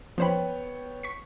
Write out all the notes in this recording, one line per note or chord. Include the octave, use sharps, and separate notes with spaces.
F3 B3 C5 C#5 G5 B5
C#6 B6 C7